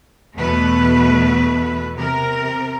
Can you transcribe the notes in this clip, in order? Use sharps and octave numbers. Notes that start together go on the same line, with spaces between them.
E2 B2 A3 B4
C3 A#4